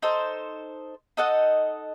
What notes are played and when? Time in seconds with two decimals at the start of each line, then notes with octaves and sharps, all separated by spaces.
0.02 D#4 A4 C5
1.17 D#4 A4 D#5 F#5